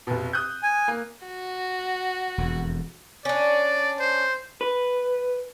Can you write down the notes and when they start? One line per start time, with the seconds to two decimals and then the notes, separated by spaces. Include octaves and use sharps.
0.07 F1 B2
0.33 D#6 F#6 G6
0.63 G#5
0.88 A#3
1.26 F#4
2.38 E1 F2
3.25 C#4 D4 D5
4.00 C5
4.61 B4